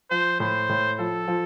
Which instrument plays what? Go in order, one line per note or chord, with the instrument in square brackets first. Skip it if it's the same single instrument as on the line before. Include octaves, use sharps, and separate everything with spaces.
[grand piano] F3 [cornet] C5
[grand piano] A2 [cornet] C5
[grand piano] A2
[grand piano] F3 [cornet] A4
[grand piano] F3